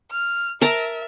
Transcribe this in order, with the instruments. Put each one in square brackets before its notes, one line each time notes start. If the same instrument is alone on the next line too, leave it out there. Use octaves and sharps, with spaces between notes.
[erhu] F6
[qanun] A#4 A5 A#5 [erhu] E5